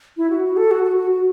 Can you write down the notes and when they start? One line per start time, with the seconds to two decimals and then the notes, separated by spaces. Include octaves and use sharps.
0.17 E4
0.30 F#4
0.44 F#4
0.57 A4
0.71 F#4
0.83 F#4
0.97 F#4
1.11 F#4